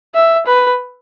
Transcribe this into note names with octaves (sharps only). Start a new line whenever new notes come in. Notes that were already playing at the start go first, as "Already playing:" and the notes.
E5
B4